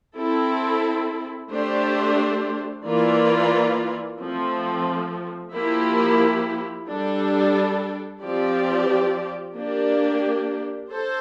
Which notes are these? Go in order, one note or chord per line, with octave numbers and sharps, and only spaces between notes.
C4 E4 A4
A3 D4 G4 C5
E3 A#3 F4 A#4 D5
F3 A3 C4
F3 A#3 E4 G4
G3 D4 A4
F3 C4 G4 D5
A#3 D4 G4
A4 C5